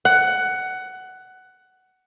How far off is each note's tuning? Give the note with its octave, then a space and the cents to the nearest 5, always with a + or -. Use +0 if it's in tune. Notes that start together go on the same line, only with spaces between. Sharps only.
F#5 +15